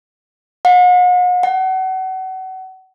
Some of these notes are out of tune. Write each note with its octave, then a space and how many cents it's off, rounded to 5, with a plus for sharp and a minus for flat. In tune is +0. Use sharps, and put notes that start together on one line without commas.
F#5 -45
F#5 +30